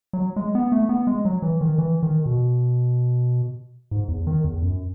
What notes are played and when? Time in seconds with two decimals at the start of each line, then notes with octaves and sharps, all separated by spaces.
0.13 F#3
0.36 G#3
0.55 B3
0.72 A3
0.89 B3
1.07 G#3
1.25 F#3
1.42 E3
1.61 D#3
1.78 E3
2.03 D#3
2.26 B2
3.91 G#2
4.08 E2
4.27 D#3
4.44 E2
4.62 F#2